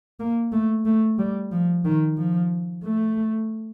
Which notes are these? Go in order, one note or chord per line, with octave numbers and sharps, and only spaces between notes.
A#3
A3
A3
G3
F3
D#3
F3
A3